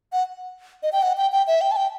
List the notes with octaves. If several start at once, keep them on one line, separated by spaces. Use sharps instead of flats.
F#5
D#5
G5
F#5
G5
G5
E5
G5
A5
G5